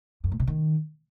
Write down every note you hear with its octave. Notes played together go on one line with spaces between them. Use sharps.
F#2
A2
C3
D#3